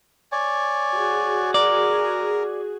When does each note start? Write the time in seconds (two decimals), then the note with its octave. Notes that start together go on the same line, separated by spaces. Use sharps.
0.32 C#5 D5 G#5
0.93 F#4 G#4
1.54 A#4 D5 A#5